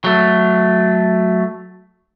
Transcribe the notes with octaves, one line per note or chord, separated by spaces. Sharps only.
F#3 A3